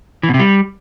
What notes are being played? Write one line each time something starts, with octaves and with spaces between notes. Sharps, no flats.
E3
B2
C3
G3